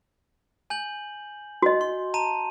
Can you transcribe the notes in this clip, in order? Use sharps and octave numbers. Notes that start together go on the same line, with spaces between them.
G#5 G6 F#7
F#4 D#5
C6
A5 A#5 D#7